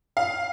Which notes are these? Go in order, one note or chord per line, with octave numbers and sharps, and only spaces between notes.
F5